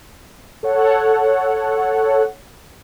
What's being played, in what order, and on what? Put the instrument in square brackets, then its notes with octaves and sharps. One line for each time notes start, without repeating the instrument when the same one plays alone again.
[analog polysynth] A4 C#5 F#5